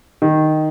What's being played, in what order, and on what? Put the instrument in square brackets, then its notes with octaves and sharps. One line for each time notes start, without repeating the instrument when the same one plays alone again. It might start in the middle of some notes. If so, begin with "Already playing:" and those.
[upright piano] D#3